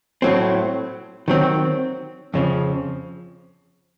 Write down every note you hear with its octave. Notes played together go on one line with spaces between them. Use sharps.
A2 F#3 C4
D#3 F#3 C4
F2 C#3 F3